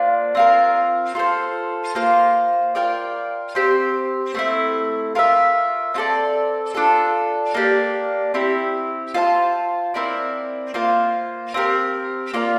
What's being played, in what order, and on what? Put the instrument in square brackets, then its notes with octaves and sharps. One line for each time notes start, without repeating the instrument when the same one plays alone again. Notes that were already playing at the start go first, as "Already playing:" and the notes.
Already playing: [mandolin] A#3 D4 F4 C5
C4 F4 A#4
F4 A4 C5
A#3 F4 C5
F4 A#4 D5 G5
C4 G4 C5
A3 C4 E4
F4 A#4 E5
C4 F4 A4 D5
D4 F4 A4
A#3 D4 G4
C4 E4 G4
F4 C5 E5 A5
C4 E4 A#4 D5
A#3 F4 C5
C4 G4 A#4
A#3 F4 A#4 D5